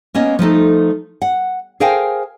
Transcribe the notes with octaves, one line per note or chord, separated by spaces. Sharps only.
A#3 B3 C#4 D#5
F3 A3 D#4 A4
F#5
G#4 A#4 C5 F5 G5 G#5